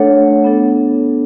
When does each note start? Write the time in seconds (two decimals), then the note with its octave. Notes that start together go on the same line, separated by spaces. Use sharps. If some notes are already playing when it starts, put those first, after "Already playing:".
Already playing: A3 D4 A4 C#5 F#5
0.44 B3 D4 A4